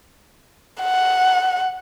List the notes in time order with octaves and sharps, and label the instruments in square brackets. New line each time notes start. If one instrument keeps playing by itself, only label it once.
[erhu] F#5